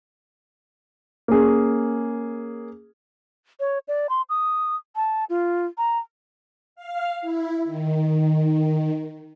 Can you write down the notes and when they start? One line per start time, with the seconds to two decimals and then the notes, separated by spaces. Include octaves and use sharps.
1.28 A#3 C#4 G#4
3.60 C#5
3.88 D5
4.10 C6
4.30 D#6
4.96 A5
5.30 F4
5.78 A#5
6.76 F5
7.21 E4
7.65 D#3